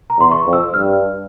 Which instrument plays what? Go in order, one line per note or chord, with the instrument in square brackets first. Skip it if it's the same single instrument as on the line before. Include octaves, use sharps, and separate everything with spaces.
[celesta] A#5
[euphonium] E2 [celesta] C6
[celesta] C#6
[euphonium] F2
[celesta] E6
[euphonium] G2 [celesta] F6